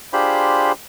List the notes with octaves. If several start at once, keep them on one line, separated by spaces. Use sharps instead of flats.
D4 F4 G4 G#4 C5 B5